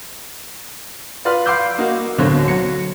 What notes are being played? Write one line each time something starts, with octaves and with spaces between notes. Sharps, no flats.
F4 B4 D5 C6 F6
F5 B5 C6 D6 E6 G6
A#3 D#4 F#4
D1 B2 D3 F#3 C4 C#5
F#3 C#7